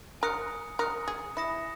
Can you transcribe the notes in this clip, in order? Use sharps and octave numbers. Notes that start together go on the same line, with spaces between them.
A#4 G#5 D#6 F#6 C#7
A#4 G#5 D#6 F#6 C#7
G#4
E4 D#6 A#6 C#7 E7